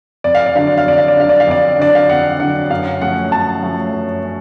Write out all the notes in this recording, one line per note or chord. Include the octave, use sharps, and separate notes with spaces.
F2 D5
F5
D5
D3 F#3 F5
D5
F5
F2 D5
F5
D5
D3 F#3 F5
D5
F5
F2 D5
D3 F#3 D5
F5
F2 F#5
D3 F#3 F#5
F#2 F5
F3 A3 C#4 F#5
F#2 A5
F3 A3 C#4
F#2
C#4